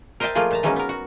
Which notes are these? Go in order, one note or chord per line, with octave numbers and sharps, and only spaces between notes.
A#4 C5 D#5 E5 G5 A5
F3 A3 A#3 F4 G#4
A#2 A5 A#5
E3 F#3 G#3 A#3 C#4 D#4
B3 A#4
F#4